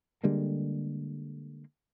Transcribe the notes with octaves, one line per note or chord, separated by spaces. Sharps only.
D3 G3 G#3 A#3